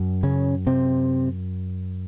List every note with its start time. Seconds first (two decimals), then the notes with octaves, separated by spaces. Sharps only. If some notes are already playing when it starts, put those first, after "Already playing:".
Already playing: F#2
0.23 C#3 C#4
0.67 C3 C4